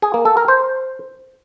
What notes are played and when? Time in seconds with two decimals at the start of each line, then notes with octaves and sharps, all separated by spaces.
0.02 G#4
0.14 A#3
0.25 A4
0.37 A#4
0.48 C5